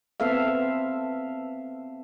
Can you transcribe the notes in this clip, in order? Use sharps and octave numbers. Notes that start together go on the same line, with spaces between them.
B3 C4 A4 E5 F5